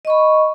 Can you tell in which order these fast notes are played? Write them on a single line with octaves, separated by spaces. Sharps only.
D#5 C#6 B5